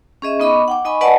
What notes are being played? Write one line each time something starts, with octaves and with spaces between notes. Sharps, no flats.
C#4 G#4 D#5 E5
B3 D#4 D#5 B5 C#6 D6
F#5 G5 D6
D#4 D#5 G#5 B5 C#6
B4 D5 D#5 F#5 G#5 A5